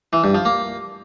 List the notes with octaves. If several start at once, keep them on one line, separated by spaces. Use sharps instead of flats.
E3
G2
F3
A#3